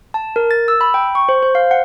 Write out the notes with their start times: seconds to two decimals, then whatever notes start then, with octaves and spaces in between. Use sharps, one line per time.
0.14 A5
0.36 A#4
0.51 A6
0.68 E6
0.81 B5
0.94 G5
1.15 C#6
1.29 C5
1.43 C5
1.55 F5
1.71 F#5